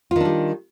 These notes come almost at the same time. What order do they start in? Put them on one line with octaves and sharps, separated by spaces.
F4 D#3 D4 G3